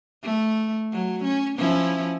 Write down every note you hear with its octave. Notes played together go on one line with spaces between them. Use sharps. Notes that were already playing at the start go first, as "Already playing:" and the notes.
A3
F#3
C#4
F3 C#4 E4